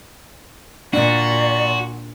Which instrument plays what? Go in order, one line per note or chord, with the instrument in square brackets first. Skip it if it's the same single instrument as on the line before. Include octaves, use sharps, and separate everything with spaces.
[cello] A#2 [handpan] D4 [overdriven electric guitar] F#4 [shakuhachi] D5